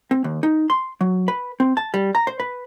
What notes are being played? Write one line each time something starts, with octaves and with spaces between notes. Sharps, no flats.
C4
D#2
D#4
C6
F#3
B4
C4
A5
G3
A#5
C5
B4